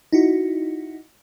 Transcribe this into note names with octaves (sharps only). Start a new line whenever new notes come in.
D#4 E4 F#4